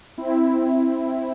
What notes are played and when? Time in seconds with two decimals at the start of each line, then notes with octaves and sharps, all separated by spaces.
0.18 C4 E4
0.38 C4 E4